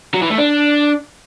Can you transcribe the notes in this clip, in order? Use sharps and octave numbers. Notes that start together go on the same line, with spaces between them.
F#3
E3
A3
D4